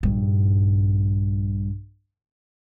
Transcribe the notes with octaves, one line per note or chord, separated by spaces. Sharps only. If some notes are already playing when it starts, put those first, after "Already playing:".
A#1 G2